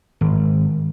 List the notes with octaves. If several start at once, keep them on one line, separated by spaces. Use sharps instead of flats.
G#1